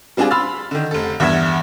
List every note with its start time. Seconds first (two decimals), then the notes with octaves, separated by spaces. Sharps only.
0.17 G3 C4 D4 F4 G#4 D5
0.31 B5 C6 E6 F6 A6
0.71 D3 D#3
0.91 F1 A4
1.20 E2 G2 B3 E5 G#6 E7